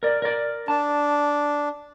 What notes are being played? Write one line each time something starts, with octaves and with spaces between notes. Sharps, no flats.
A#4 D5
A#4 D5
D4 A5